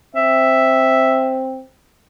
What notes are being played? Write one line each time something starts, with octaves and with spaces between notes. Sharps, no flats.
C4 E5